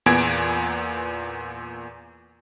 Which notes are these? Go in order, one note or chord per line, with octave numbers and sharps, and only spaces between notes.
E2 A#2 B3 G#5 G#6 D7